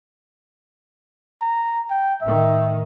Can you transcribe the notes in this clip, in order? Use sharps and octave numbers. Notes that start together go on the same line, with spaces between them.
A#5
G5
A2 D#3 E5